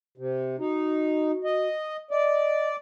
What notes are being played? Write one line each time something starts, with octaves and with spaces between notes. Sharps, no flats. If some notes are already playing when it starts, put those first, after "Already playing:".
C3
D#4 F#4
D#5
D5 D#5